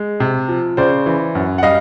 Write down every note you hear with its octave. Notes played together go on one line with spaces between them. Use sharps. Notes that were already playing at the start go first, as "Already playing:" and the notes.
Already playing: G#3
C3
F3
C#3 C5 D5
E3
F#2
F#5
G3 D#5 F5